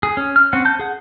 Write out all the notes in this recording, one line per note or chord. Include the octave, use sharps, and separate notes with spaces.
G#4
C#4
F6
C4 C#4 F#5
A5 G6
G#4 F#5